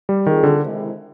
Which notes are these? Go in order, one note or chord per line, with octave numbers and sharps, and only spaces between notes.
G3
D#3 G3 C4 F4 G#4
D3
C3 D#3 G#3 C4 E4